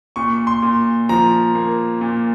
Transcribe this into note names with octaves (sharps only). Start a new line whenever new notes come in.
A#2 C#6
C6
A#2
F3 A#5
A#3
A#2